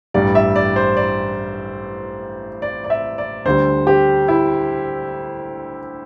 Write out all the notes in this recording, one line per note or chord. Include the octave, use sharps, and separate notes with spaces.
A1 G2 G3 D5
E5
D5
C5
D5
D5
D5
E5
D5
D2 D3 G3 C5
G4
E4